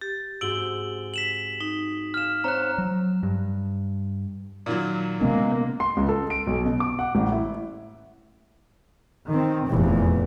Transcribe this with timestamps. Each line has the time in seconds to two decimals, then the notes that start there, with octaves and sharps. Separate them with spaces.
0.01 G4 A6
0.41 G#2 C4 F#4 G#4 E6 D7 F#7 G7
1.14 B6 E7 F#7
1.61 D#4
2.14 F5 G#5 F6 E7
2.44 C4 C5 C#5 A#5 F#6
2.78 F#3
3.23 G2
4.66 A#2 D#3 F#3
5.21 C3 G#3 A#3 B3 C#4
5.80 C6
5.97 C#2
6.09 A4
6.30 D7
6.47 B1
6.66 B2
6.80 D6
6.99 F#5
7.15 A1
7.32 E4
9.28 D#3 C4
9.67 F1 E2 A#2 E3